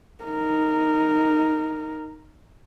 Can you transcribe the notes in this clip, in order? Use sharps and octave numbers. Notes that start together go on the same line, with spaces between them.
D#4 A#4